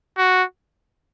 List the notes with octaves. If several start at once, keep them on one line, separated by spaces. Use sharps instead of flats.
F#4